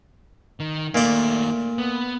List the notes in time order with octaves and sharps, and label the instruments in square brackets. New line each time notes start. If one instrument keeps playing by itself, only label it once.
[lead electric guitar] D#3
[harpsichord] A#2 D5 [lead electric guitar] D#3 A3
[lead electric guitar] B3